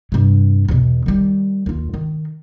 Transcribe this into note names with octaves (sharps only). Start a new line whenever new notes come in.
G2 C3
E2 B2
D#3 G3
D#2 F4
D#3